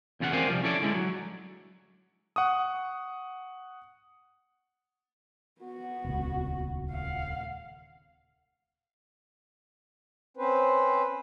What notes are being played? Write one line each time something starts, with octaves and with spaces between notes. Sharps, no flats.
E2 C#3 F4 G4 F#5
C4 A#4 C5 D5 F5 G#5
C2 F3 G3
C#4 E4 A4 D5
D3 G#3 E4
F#3
F#5 C#6 D#6
B3 F#4
D#1 C#2
F5 F#5
C4 C#4 B4 C5